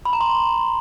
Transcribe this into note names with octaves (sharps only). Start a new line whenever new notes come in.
B5
A#5
C6